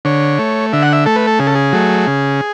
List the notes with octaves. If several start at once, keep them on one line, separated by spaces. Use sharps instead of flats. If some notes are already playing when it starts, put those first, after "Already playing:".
D3 C#5
A3
D3 E5
F#5
E5
A3 A4
B4
A4
C#3 G#4
A4
G#4
F#3 A3
C#3